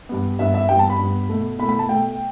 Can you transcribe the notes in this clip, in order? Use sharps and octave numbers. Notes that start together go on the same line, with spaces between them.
G2 G3 B3
G2 G3 B3 E5
E5
G2 G3 B3 G5
A5
B5
G2 G3 B3
B2 A3
B2 A3 B5
B5
A5
B2 A3 G5